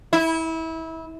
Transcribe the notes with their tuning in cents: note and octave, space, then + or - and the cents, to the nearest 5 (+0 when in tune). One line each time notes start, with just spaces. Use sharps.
E4 -25